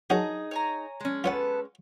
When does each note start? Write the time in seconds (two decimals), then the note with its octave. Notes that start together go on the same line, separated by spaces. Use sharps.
0.10 F#3 D#4 F#4 G#4 A#4
0.51 C#5 G#5 A#5
1.00 G#3 C#4
1.24 B3 F4 A4 B4 C#5 F#5